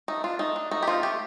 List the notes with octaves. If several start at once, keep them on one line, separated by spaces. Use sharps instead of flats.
A3 D#4
D4 F4
A3 D#4
D4
A3 D#4
G4
C4 D#4 F4
A3 G4